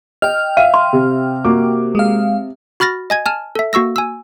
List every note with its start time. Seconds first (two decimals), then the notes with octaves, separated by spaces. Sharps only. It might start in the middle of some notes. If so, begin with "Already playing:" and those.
0.22 D#5 G5 F6
0.57 E5 F5 D#7
0.74 C6
0.93 C3
1.45 A#3 F#4 D6
1.95 G#3 F5
2.80 F#4 B5 F6 A6 A#6
3.10 D#5 G#5 G#6
3.26 G#5 A5 F6
3.55 A4 E5
3.73 A#3 F#4 C#6 E6 A#6
3.96 G#5 E6